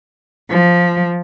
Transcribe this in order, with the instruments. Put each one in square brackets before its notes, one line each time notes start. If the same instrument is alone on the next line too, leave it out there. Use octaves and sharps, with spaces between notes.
[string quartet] F3